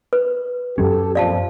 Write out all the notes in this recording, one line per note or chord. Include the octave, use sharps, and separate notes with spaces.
B4
F#2 F#3 C#4 G4 A4
F2 A#2 F3 D5 F5 A5